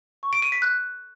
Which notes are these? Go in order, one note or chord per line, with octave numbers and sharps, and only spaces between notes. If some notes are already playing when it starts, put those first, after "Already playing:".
C#6
D7
D#7
B6
F#6